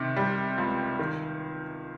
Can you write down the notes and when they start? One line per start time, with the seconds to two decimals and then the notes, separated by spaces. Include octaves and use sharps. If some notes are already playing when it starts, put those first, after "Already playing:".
Already playing: C3 D#3
0.16 G3
0.58 C#2
0.99 D#3